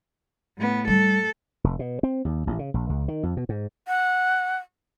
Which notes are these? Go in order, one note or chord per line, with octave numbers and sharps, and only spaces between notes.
A2 B3
G3 A4
F1
B2
C4
D#2
A1
C#3
A#1
C#2
D#3
F2
B2
G#2
F#5